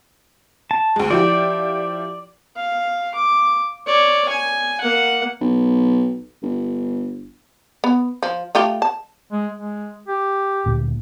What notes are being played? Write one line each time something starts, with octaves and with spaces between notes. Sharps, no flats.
A5
D2 G#3
F3 E4 G4 D5
F5
D6
C#5 D5
G#5
A#3 F#5
B1
G1
B3
F3
A3 F4 G4
A5
G#3
G#3
G4
D2 A#2